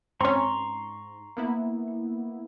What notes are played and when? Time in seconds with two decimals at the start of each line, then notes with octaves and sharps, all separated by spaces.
0.21 G#2 C4 C#4 A#5 C6 C#6
1.37 A#3 B3 E4